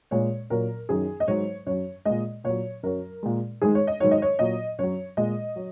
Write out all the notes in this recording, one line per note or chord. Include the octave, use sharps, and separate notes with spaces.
A#2 G#3 C#5
A#2 F#3 A#4
F#2 D#3 F#3 G#4
D#5
G#2 F#3 C#5
F#2 F#3 C#5
A#2 G#3 D#5
A#2 F#3 C#5
F#2 F#3 A#4
A#2 G#3
G#2 D#3 G#3 G#4
C#5
D#5
G#2 D#3 F#3 C#5
D#5
C#5
A#2 F#3 D#5
F#2 F#3 C#5
A#2 G#3 D#5
F#3